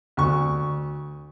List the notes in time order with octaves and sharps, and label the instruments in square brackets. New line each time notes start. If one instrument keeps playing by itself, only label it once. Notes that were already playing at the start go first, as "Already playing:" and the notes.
[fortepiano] D2 C#6